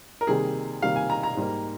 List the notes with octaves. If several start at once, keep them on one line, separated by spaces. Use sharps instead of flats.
A#4
C3 D#3 G3 A#3 G#4
C3 D#3 G3 A#3 F5
G#5
A#5
A#5
G#2 G3 A#3